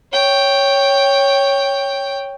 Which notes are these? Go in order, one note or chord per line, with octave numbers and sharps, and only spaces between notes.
C#5 G5